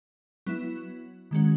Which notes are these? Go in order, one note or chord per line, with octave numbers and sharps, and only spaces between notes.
F#3 B3 E4
D#3 G#3 C#4 F#4